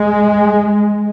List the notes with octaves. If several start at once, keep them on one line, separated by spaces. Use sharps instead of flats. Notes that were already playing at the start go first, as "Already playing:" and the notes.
Already playing: G#3